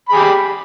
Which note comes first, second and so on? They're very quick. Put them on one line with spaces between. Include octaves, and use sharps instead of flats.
B5 G#4 G4